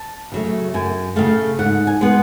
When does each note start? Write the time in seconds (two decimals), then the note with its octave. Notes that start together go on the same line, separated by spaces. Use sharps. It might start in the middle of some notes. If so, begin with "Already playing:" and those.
Already playing: A5
0.32 C#3 F#3 A3
0.74 F#2 G#5
1.16 C#3 F#3 A3 F5
1.59 G#2 F#5
1.87 G#5
2.01 G#3 B3